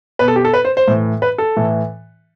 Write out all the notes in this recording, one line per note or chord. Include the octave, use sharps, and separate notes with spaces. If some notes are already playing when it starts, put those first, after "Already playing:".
B2 B4
A4
G4
A4
B4
C5
C5
A2 E3
B4
A4
A2 E3